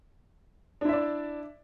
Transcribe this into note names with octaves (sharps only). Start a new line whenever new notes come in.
D4 E4 D5 E5